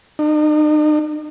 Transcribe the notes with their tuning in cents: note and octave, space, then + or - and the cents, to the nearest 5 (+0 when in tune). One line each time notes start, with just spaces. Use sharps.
D#4 -45